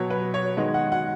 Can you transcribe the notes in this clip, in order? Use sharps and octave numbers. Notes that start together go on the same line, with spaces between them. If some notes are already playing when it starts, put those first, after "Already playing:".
Already playing: B2 F#3 B3 C#5
B4
C#5
D#3 G#3 B3 D#5
F#5
F#5